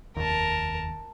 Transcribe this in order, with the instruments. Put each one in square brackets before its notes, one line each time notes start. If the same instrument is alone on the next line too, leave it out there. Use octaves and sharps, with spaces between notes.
[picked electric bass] F1 D#2 [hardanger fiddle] A#4 A5